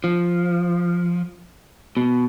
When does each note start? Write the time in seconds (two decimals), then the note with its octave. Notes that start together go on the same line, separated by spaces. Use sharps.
0.04 F3
1.97 B2